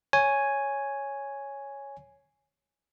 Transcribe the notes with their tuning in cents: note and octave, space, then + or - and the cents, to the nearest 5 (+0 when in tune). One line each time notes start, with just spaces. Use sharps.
C#5 +0 G#5 +0